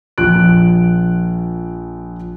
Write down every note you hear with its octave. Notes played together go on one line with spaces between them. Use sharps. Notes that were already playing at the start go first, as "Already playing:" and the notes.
A#1 F3 F4 F#6 D7